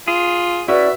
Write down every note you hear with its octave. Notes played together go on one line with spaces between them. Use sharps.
F4 G#4
C#4 E4 F#4 B4 D5 E5